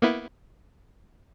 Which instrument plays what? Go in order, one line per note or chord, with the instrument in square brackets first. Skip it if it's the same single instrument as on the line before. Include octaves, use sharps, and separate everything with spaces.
[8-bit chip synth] A#3 B3 E4